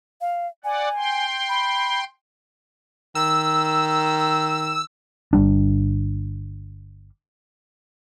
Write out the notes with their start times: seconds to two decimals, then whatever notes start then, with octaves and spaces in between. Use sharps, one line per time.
0.21 F5
0.64 D5 F#5 G#5
0.97 G5 C6
1.49 B5
3.15 D#3 E6
5.33 G1 E2 G3 D4